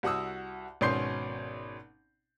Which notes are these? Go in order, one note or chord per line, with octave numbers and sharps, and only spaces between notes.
C2 F#4 F#5 D#6 E6
G#1 B2 C#4 C6 G6 C7